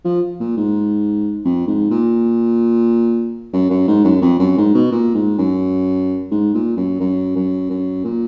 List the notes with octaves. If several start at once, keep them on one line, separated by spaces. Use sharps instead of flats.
F3
A#2
G#2
F2
G#2
A#2
F#2
F#2
G#2
F#2
F2
F#2
G#2
B2
A#2
G#2
F#2
G#2
A#2
F#2
F#2
F#2
F#2
A#2